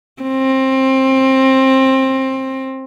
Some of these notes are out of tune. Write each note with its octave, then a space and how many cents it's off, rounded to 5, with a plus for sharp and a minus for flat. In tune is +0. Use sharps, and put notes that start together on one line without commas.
C4 +20